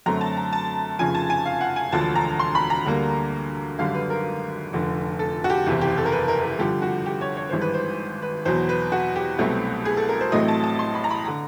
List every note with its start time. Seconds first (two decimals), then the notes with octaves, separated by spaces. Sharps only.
0.06 F#2 D3 F#3 A3 C4 A#5
0.21 A5
0.37 A#5
0.53 A5
0.99 F1 F2 C#3 F3 G#5
1.15 A5
1.30 G#5
1.46 F5
1.61 F#5
1.76 G#5
1.92 E1 D2 D3 F3 A5
2.15 A#5
2.39 C6
2.55 B5
2.70 A#5
2.86 D2 D3 G3 A#3
3.78 G#1 F#2 D3 G3 F5
3.94 B4
4.10 A#4
4.73 F1 F2 D3
5.19 A4
5.44 F#4
5.50 G4
5.66 F#1 E2 C3
5.81 G4
5.98 A4
6.05 A#4
6.12 B4
6.28 A#4
6.43 A#4
6.59 G2 D3 F3 G4
6.82 F#4
7.06 G4
7.21 C#5
7.37 C#5
7.49 G#1 G2 E3 G#3 C5
7.61 B4
7.74 C5
8.22 B4
8.45 E2 B2 F#3 B3 C5
8.69 B4
8.92 F#4
9.16 G4
9.39 C2 B2 F#3 A3 C4
9.85 G#4
9.97 A4
10.09 A#4
10.20 C5
10.32 A1 A2 F#3 A3 C4 D#5
10.48 A5
10.64 A5
10.79 C6
10.95 B5
11.04 A#5
11.11 B5
11.25 D3 A#5